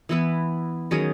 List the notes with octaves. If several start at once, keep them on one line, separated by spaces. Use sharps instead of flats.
E3 B3 E4 B4
D#3 F#3 C#4 G#4